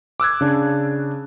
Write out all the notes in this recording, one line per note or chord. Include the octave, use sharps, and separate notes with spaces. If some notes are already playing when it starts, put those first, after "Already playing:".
D6 E6 F#6 G#6
C#3 D4